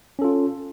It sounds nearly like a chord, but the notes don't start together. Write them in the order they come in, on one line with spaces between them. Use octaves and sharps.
C#4 A4 F4